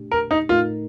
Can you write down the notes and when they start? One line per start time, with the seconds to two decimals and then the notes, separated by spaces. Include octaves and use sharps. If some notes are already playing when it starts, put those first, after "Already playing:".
Already playing: A#2 A3 D4 G4
0.11 A#4
0.31 D#4
0.49 A2 A3 D#4 F4 A#4